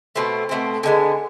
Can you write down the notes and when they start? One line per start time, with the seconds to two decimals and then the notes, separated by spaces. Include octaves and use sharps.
0.16 B2 A3 C4
0.49 B2 A3 C4
0.83 D3 G#3 B3